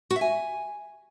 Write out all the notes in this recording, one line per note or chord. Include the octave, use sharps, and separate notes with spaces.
F#4
E5
G#5